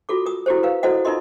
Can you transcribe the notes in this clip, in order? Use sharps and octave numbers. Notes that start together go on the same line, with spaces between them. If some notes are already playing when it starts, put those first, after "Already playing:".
F4 F#4 A4 D6
A#4 D#6
E4 F#4 G4 A4 C5
A#4 B4 F5
E4 F#4 A4 C5 D#5 F#5
D#4 F4 A4 A#4 D#5 C6